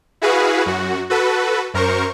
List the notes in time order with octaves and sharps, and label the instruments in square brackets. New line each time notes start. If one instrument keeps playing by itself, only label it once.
[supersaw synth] E4 F#4 G#4 B4 F5
F#2 F#4
F#4 A4 B4
F#2 A#4 C5 C#6